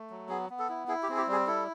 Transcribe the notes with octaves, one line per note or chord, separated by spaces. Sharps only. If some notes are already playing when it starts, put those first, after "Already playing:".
Already playing: A3
F#3
B3 G#4
B3
A4
E4
E4 G#4
G4
C4 G#4
G4
G3 G#4
E4 A4